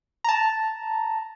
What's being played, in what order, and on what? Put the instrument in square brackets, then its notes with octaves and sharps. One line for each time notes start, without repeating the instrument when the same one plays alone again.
[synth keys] A5 A#5